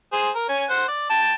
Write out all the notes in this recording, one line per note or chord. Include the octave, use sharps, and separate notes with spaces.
G#4 C5
A#4
C#4 G#5
C5 F#5
D5
G5 A5